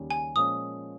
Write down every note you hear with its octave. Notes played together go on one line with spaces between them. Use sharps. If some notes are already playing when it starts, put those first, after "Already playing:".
Already playing: D#2 C#3 G3 C#4
G#5
A#2 F3 G#3 C#4 D#6